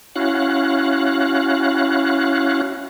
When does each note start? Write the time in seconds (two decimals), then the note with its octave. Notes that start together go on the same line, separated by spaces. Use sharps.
0.16 C#4 E4 F#4 F5 F#6